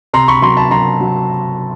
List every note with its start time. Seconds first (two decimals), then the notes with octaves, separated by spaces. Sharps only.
0.13 C3 A#5 C6
0.28 B5 C#6
0.42 F#3 A#5 C6
0.57 A5 B5
0.71 F#3 A#5 C6
1.00 F#3